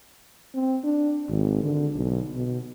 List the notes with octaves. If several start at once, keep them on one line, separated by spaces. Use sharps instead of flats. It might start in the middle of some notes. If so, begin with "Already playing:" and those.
C4
D4
G#1
D3
B1
B2